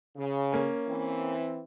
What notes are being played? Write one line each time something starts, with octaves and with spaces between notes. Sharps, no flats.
C#3
A#3 C#4
E3 C4